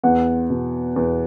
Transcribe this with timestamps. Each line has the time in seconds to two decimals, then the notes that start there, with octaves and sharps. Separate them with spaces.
0.03 E2 F#5
0.50 B2
0.96 E2